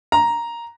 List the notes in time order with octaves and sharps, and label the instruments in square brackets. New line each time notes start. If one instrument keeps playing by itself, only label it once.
[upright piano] A#5